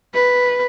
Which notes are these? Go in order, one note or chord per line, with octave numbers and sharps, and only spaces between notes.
B4